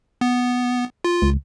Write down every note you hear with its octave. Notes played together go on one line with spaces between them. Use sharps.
B3
F4
C#2